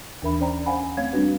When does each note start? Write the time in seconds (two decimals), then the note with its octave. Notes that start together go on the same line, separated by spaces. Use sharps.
0.22 D#2 E3 D4 A#4 E5 B5
0.40 C#4 C5 D5 G5 A#5
0.66 C5 F5 F#5 G#5 B5
0.97 A3 C4 C#5 F5 G#6
1.13 G3 B3 C4 D4 F#4 B4